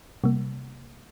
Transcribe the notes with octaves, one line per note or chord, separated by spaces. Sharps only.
C3 G3 A#3